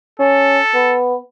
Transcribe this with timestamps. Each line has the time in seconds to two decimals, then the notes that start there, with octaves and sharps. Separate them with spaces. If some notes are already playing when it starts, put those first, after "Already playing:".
0.19 C#4 A4
0.74 B3